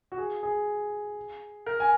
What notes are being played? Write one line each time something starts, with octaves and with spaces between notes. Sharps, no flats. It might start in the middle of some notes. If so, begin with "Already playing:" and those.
F#4
G#4
G#4
A#4
G#5